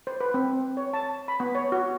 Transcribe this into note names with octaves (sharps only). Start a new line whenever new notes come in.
C5
B4
C4
C#5
A5
B5
B3
C#5
F#4